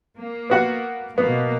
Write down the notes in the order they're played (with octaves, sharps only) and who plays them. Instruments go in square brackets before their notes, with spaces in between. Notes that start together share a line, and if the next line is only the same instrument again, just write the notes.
[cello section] A#3
[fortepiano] B3 F#4 F#5
[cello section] B2 A#3 [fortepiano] B3